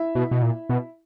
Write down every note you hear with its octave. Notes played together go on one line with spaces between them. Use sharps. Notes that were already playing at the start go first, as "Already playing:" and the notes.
Already playing: E4 E5
B2
B2
A#2
B2